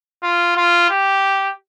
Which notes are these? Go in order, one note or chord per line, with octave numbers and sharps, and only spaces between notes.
F4
F4
G4